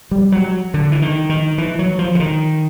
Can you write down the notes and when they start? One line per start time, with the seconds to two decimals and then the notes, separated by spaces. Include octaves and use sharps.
0.11 G3
0.32 F#3
0.74 D3
0.92 E3
1.02 D#3
1.29 D#3
1.58 E3
1.79 F#3
1.99 F3
2.15 D3
2.20 D#3